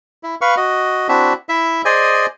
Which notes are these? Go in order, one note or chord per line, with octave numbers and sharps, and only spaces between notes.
E4
B4 F5 C#6
F#4 D#5
C4 D4 E4 F#4 E5
E4 E5
G#4 C5 D5 D#5 G#5